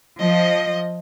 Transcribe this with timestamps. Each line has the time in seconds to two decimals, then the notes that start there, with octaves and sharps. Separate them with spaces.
0.19 F3 D#5